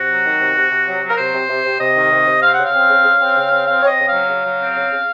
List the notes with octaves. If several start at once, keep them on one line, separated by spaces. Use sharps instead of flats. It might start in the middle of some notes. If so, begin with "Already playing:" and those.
Already playing: C3 F#4
F#3
D#3
C3
C3
C3
F#3
F#3
A#4
C3 C5
C3
C3
C3
C3 D#5
D#3
C3
C3
C4 F5
C#3 F#5
F5
C4
C#3
C#3
C4
C#3
C4
C4 F5
C4 C#5
D#5
C#3
F#3 F5
C#3
F#3
C4
C#3
C#3